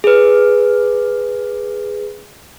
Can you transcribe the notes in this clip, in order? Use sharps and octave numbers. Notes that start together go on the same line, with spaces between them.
G#4 B4